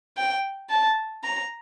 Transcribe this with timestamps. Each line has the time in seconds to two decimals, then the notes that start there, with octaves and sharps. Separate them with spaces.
0.17 G5
0.70 A5
1.24 A#5